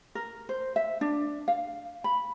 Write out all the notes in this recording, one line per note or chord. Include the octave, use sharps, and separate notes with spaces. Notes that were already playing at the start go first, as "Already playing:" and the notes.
A#4
C5
E5
D4
F5
B5